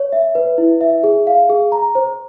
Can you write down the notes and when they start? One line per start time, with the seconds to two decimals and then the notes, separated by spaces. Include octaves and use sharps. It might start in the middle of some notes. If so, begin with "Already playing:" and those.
Already playing: C#5
0.12 E5
0.35 B4
0.58 E4
0.81 E5
1.04 G#4
1.27 F5
1.49 G#4
1.72 A#5
1.95 C5